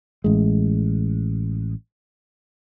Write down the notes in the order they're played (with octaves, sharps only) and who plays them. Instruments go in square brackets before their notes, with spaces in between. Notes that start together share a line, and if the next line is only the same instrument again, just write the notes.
[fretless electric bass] A1 G#3